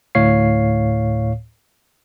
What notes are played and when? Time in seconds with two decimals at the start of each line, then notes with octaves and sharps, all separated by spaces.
0.15 D2 A2 C#5 F5 C7